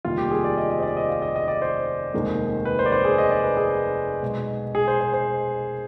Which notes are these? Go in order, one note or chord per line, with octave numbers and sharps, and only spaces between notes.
F1 D#2 D#3 G3 F4
G4
G#4
D5
D#5
D#5
C5
D5
D#5
F5
D#5
D#5
D5
C5
F1 D#2 D#3 G#3
B4
C5
D5
C5
G#4
D#5
D5
B4
G#4
B1 B2 G#3
G#4
C5
C5
C5